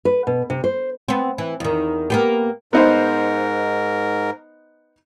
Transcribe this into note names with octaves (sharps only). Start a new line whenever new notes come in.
B4
B2
C3
C5
B3 C4
E3
E2 D#3
A#3 B3 G4
G#2 B3 D#4 A#4 C5